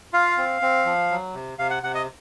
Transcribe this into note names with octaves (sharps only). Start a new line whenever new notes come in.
F4 F5
C4
C4
F3
F#3
C3
C3 F5
F#5
C3 F#5
D#5